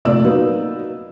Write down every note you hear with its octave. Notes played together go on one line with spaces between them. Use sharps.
F1 A#2 A3 D5 E6
F#3 A#3 B3 D#4